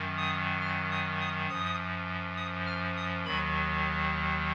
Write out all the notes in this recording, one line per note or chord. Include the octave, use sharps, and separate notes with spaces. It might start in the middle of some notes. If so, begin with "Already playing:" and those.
Already playing: F#2 D#3 F#3
D#6
F6
D#6
D#6
F#2 F3 D#6
D#6
F6
D#6
D#2 D#3 F#3 B5